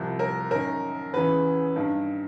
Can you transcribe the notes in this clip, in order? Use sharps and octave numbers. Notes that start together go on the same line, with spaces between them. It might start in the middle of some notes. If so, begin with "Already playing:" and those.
Already playing: C2 C3 F3
A#4
F#2 D#3 A#4
E2 C#3 E3 B4
G2 D#3